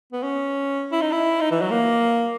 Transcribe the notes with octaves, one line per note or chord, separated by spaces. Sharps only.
B3
C#4
E4
D#4
E4
D#4
E3
F#3
A#3